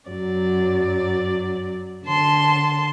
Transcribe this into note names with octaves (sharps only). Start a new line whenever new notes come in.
F#2 F#3 D5
D3 A5 C6